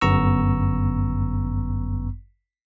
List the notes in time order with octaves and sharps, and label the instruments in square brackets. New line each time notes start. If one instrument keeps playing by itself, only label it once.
[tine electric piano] G1 F#2 B3 A#5 C#6 E6